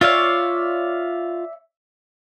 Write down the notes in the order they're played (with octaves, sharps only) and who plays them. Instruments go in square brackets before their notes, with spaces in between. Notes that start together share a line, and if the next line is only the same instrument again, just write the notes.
[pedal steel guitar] F4 F5 [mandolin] C#5 D5 E5